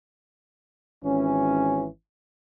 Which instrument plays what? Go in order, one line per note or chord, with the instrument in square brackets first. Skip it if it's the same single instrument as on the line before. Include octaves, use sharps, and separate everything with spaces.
[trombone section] G#1 E3 C#4